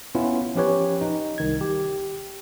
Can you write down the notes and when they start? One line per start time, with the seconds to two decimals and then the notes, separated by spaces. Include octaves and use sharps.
0.15 B3 C#4 E4 F4
0.55 F3 C#4 G4 B4 C#5
1.01 D#4
1.38 C2 D#3 G#6
1.61 G4